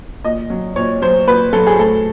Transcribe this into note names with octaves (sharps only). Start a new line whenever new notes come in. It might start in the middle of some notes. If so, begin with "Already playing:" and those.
A#2 D#5
F#3
A#2 C#5
F#3 C5
A#2 B4
F#3 A4
G#4
A2 A4